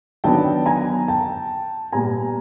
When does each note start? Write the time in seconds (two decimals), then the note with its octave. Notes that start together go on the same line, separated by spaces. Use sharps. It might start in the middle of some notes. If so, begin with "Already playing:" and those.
0.24 D#3 F#3 B3 D4 G5 A5
0.66 G#5 A#5
1.08 G5 A5
1.92 A#2 G3 B3 G#5 A#5